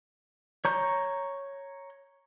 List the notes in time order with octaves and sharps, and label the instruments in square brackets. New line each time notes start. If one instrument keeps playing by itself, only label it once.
[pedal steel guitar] C#5 A#5 G6